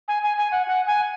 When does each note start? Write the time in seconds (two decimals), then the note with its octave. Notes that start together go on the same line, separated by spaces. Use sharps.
0.08 G#5
0.23 G#5
0.38 G#5
0.52 F#5
0.67 F#5
0.87 G#5